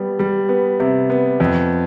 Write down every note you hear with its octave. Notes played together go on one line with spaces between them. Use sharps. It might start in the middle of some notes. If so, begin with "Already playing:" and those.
Already playing: G3 B3
G3
B3
C3
B3
F2